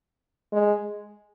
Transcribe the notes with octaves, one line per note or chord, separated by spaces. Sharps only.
G#3